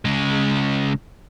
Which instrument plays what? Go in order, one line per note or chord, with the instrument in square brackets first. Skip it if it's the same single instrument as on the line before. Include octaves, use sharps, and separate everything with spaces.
[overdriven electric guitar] C#3 G#3